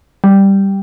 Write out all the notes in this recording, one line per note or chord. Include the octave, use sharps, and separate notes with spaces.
G3